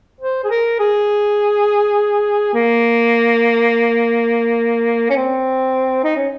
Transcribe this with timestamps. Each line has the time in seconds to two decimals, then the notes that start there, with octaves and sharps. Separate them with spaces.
0.21 C5
0.44 G#4
0.51 A#4
0.79 G#4
2.54 A#3
5.10 C#4
5.16 C4
6.04 D#4
6.16 C#4